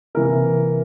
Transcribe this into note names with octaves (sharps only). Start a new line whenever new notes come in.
C3 E3 A#3 A#4